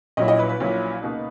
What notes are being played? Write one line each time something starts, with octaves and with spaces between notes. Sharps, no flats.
A#1 A#2 F#3 C#4 E4 D#5
D#5
B4
B4
A#1 A#2 F#3 C#4 E4
C#2 B2 A#3 D#4